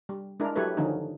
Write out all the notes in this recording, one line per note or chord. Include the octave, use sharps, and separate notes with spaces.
G3
G#3 D4 E4 A#4
F#3 E4 G4 A4 B4 C#5
D3 D#3 F3 C#4 D#4